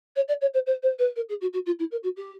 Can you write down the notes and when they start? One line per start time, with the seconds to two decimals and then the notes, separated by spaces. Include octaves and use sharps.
0.16 C#5
0.28 D5
0.41 C#5
0.54 C5
0.66 C5
0.83 C5
0.99 B4
1.16 A#4
1.29 G#4
1.41 F#4
1.53 F#4
1.66 F4
1.79 E4
1.91 A#4
2.03 F#4
2.17 G4